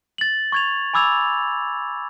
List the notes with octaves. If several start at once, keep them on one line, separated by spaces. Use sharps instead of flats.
A6 F#7
C#6 G#6 F7
G#5 B5 D6 E6 G#6 F7